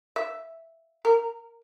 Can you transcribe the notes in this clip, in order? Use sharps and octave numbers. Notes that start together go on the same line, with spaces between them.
E5
A#4